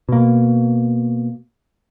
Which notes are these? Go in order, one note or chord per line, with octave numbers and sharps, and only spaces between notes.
B2 A#3